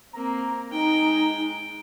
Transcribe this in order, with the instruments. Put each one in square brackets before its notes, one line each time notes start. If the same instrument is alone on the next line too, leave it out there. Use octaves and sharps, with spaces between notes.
[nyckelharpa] A#3 C4 [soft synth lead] A#5
[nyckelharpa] G#3 G5 [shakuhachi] D#4